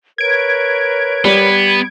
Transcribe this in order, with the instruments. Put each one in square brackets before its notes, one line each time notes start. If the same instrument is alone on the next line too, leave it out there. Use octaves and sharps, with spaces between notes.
[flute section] A#4 B4 C#5 [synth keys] G#6 D7
[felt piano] G3 [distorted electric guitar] B3